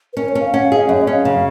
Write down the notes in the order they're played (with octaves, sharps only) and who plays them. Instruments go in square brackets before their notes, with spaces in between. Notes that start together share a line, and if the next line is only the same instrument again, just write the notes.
[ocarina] B4
[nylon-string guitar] C#4 [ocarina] A#4
[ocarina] C#5
[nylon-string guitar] C#4
[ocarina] F5
[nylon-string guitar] C#4 [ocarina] F#5
[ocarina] F5
[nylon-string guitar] G#4
[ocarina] D#5
[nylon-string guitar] F#2 [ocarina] C#5
[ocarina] D#5
[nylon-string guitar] C#4
[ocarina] F5
[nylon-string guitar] C#3